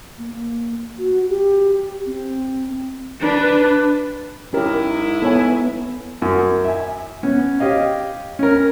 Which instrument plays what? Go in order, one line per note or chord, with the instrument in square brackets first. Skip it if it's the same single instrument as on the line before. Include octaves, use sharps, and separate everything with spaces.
[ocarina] A#3
F#4
G4
C4
[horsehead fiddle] D4 B4
[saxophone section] G#2 E4 [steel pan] C#4 G4 A#4
[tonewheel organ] B3 [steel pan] A4 C#5 G#5
[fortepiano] F#2
E5 G#5
B3 C#4
G4 C#5 D#5 F5
C#4 A#4